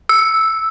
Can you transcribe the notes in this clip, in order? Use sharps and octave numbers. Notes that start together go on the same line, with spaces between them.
E6